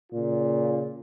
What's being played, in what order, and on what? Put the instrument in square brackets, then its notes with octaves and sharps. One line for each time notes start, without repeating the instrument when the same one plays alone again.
[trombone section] A#2 C#3 F4